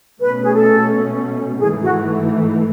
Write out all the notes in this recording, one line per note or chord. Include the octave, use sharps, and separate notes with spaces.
B2 A3 C#4 B4
G#4
A4
G#2 E3 A3 G#4
F#4